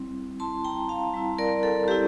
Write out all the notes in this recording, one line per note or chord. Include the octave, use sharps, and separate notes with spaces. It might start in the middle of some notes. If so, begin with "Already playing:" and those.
Already playing: G3 C4 E4
G3 C4 E4 A5 C6
G5 A#5
F5 A5
G3 C4 E4
A#4 D5
A4
G3 C4 E4 G4